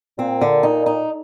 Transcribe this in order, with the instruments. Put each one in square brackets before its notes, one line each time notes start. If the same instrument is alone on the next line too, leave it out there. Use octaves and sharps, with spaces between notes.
[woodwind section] A#2 [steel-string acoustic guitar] C4
[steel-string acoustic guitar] D3
D#4
D#4